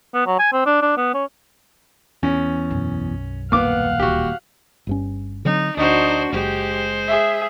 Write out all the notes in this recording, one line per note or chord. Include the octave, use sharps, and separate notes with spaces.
B3
F#3
G#5
C4
D4
D4
B3
C#4
E2 C#4
B1 F#2
D#1 F2 A#3 B3 F5 F#5 D6 F6
D1 A1 F#4 G4
G1 G2 C#4
D3 F#3 C4 D#4
D2 D4 D#4 F#4 C5
F#1 G#3 G4 C5
G#4 E5